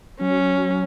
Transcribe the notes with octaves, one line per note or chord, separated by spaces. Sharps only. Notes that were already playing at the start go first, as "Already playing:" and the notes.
F#3 C#4